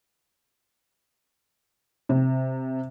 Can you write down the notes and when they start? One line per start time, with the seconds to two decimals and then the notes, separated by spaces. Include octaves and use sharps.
2.09 C3